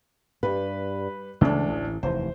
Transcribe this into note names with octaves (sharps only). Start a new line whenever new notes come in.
G2 G3 B4
D2 C#3 E3 G#3 D4
A1
F1 D#2 E3 C5